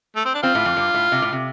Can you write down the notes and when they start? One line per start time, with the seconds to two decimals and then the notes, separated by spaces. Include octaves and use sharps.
0.16 A3
0.25 C4
0.34 D4
0.43 C4 F4
0.55 A2
0.65 F2
0.77 G2
0.94 A2
1.12 C3
1.22 A2
1.33 C3